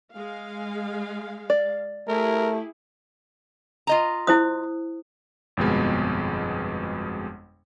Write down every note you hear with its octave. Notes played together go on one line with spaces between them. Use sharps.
G#3 F5
D5
A3 E4 G4 G#4 A#4
F4 D#5 A#5
E4 C5 D#6
G1 F2 B2 G#3